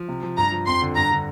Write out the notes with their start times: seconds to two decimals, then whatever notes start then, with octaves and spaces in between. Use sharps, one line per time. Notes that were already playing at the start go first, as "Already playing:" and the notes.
Already playing: F3
0.08 C3
0.23 F3
0.37 G2 A#5
0.52 F3
0.67 F2 C6
0.81 D3
0.96 G2 A#5
1.11 D3